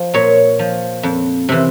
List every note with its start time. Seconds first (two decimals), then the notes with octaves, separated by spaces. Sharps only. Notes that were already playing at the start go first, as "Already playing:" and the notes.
Already playing: F3
0.14 A#2 C#5
0.59 F3
1.03 F2
1.49 C3 E3